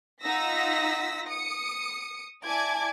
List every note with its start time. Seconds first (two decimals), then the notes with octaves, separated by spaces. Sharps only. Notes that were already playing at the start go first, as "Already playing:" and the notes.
0.22 D#4 F4 F#5 E6 A#6 B6
1.28 D#6 C#7
2.44 E4 D5 G#5 A5 D6 G#6